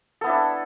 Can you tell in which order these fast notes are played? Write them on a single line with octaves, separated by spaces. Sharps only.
A4 B3 E4 D4